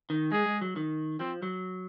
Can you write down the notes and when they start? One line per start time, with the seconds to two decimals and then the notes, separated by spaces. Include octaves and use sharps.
0.10 D#3
0.32 G#3 G#4
0.46 G#3
0.61 F#3
0.76 D#3
1.19 F3 C4
1.42 F#3